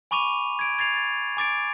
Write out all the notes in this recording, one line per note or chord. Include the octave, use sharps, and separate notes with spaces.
G#5 B5 C#6 D6 D#7 F7
G#6 D7
G#6 A6 C7 F7
A6
G#5 D6 A6 D7